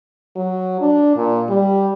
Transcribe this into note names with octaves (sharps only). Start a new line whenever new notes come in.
F#3
D4
A#2
G3